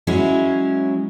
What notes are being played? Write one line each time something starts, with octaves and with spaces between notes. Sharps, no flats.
F#3 G#3 C#4 E4